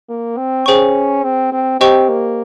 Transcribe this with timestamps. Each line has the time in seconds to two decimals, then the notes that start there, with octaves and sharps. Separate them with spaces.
0.10 A#3
0.37 C4
0.66 C#4 G#4 C5 G5 C#6
1.23 C4
1.53 C4
1.80 C4 G4 C5 D#5 G5 C#6
2.09 A#3